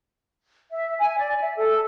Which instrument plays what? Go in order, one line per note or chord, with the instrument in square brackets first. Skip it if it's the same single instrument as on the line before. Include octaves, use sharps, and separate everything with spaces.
[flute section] E5
G#5
D5
E5
A4